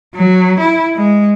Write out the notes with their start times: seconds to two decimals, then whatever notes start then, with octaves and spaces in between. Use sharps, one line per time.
0.15 F#3
0.60 E4
0.96 G#3